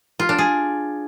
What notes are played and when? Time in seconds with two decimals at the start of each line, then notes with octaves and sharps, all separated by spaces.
0.19 F4
0.29 D4
0.38 G#4